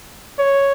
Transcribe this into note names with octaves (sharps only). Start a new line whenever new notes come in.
C#5